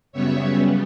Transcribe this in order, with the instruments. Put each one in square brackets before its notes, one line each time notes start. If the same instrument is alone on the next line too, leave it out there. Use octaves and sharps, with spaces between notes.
[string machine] F#2 C#3 G3 B3 C#5 E5